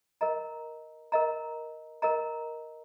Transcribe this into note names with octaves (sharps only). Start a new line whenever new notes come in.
A#4 D#5 A#5
A#4 D#5 A#5
A#4 D#5 A#5